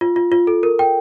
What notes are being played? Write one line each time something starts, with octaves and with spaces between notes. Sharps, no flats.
F4
F4
F4
A4
A#4
G5